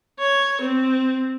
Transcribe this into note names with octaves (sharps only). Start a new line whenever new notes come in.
C#5
C4